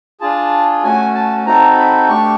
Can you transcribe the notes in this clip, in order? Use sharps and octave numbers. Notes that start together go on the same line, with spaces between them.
D4 F4 G#4 A5
A3 C#4 F#4 G#5
A5
C4 D#4 F#4 A4 A#5
B5
A3 D4 G4 C#6